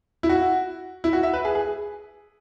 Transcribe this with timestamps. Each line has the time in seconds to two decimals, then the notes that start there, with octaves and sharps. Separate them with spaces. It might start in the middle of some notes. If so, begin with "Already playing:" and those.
0.23 E4
0.29 F#4
1.04 E4
1.13 F#4
1.23 E5
1.33 B4
1.45 G#4
1.55 G#4